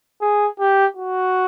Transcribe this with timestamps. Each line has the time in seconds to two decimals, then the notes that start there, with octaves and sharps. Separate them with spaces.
0.22 G#4
0.60 G4
0.97 F#4